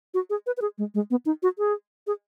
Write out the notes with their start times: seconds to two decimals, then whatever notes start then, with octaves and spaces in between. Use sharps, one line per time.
0.14 F#4
0.30 G#4
0.47 B4
0.57 B4
0.62 G#4
0.78 G#3
0.94 G#3
1.11 B3
1.26 D#4
1.43 F#4
1.58 G#4
2.07 G#4